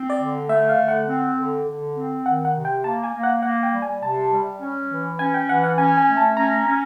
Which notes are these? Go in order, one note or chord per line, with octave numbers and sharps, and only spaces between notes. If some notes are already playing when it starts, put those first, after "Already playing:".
Already playing: C4
D5
D3
A3 E5
F5
D3
F#5
C4
D3
D3
C4
D#3 F#5
F#5
C3
G5
A#3 A5
G#5
A#3
F#5
A#3 F#5
G5
G3
G#5
C3 A5
G3
C#4
E3
C#4 G#5
G5
E3 F#5
F#5
C#4 G#5
G#5
A3
A5
C#4 A#5
C#4